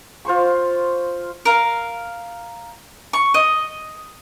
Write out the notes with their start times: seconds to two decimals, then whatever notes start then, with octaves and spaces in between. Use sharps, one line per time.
0.25 F4 C5 C6 C#6
1.45 A#4 F5
3.13 C#6
3.34 D#5